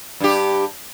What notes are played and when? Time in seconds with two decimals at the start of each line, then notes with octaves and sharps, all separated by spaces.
0.20 G2 G4